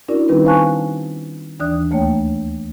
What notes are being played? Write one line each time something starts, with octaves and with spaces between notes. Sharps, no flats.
C#4 D4 E4 F#4 A#4 D5
D#3 G3 C4 D#4 B4
C5 F5 G#5 A5 C#6 F#6
D#2 E3 D4 D5 D#6 F#6
D2 A3 A#3 C#5 G5